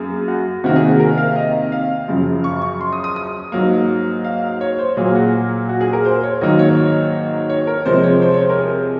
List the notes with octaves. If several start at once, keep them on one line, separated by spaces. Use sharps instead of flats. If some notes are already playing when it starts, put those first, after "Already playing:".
Already playing: F#2 A#3 G#4
F#4
C3 D#3 A#3 F#4
G#4
F#4
A#4
F5
D#5
F5
F#2 C#3 F3
C#6
C#6
C6
D#6
D#6
D#6
G#2 F#3 A#3
F5
C#5
C5
A#2 F#3 A#3 G#4
F#4
F#4
G#4
A#4
C5
C#5
G#2 D#3 F#3 A#3 D#5
C#5
C#5
A#4
C3 F3 G#3 C5
C#5
C5
C#5
C5
A#4
G#4